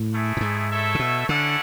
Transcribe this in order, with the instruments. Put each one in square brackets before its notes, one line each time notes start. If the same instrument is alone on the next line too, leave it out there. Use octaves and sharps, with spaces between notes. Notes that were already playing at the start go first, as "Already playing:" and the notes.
Already playing: [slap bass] A2
[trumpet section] A3 E4 G#4
[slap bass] A2
G#2
[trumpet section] A3 E4 A4 C#5 E5
[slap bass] C#3
B2
[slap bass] D3 [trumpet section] C#4 E4 A4 D5 F#5